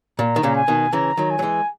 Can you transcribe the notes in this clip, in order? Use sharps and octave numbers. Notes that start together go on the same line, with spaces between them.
A#2 A#5
D#3
A#2 C#3
G#5
B2 D#3
C#3 E3 A#5
D#3 F#3
G#5
F#3
E3 G#3